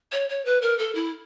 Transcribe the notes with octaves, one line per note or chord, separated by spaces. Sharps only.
C#5
C#5
B4
A#4
A4
E4